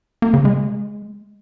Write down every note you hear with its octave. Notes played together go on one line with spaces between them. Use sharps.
A#3
C#3
G#3